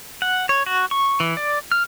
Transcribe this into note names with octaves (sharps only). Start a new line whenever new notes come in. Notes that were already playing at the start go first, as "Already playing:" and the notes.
F#5
C#5
F#4
C#6
E3
D5
F6